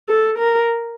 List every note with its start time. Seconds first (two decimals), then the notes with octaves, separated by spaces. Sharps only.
0.09 A4
0.38 A#4